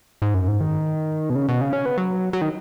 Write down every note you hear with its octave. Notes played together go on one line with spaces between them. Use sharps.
G#2
F#2
G#2
D#3
B2
C#3
B2
C#3
C#4
B3
F#3
F#3
D#3